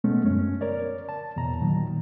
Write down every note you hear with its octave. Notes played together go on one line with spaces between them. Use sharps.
B2 G#3 A3 B3 C#4
F#2 C#4
A#4 C#5 D5
A5
E2 B2 A#5
A#2 D#3 F#3